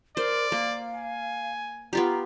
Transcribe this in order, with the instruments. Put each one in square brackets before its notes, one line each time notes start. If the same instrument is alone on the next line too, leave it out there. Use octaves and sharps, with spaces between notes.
[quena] A#4 [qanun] C5 [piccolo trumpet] D5
[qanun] A#3 [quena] F5
[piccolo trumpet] G#5
[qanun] B3 F4 G4 [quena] A#5